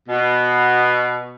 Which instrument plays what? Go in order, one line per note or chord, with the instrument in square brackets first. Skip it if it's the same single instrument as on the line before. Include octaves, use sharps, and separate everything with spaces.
[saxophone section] B2